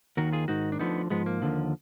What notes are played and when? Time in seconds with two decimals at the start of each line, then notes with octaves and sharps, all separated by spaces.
0.17 D#2 D#3 F#4 A#4
0.33 F4 G#4
0.48 G#2 D#3 D#4 F#4
0.72 D4
0.79 D2 D3 F3 B3 D#4
1.10 G#2 F3 G#3 B3
1.26 A#3
1.42 D#2 D3 F3